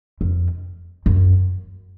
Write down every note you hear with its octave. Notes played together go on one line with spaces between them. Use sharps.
F2
F#2